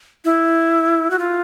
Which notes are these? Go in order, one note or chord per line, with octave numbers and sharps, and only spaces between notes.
E4
F#4
F4